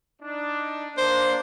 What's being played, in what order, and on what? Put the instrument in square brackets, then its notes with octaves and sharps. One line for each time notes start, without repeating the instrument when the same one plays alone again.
[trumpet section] D4 D#4
[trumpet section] A#3 D4 [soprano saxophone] C5